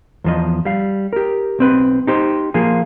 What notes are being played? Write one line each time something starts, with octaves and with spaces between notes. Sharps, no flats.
E2 F3 D#5
G3 F5
G4 A#4
B1 C4 B4
D#4 G4 C5
F3 A#3 F4 G#4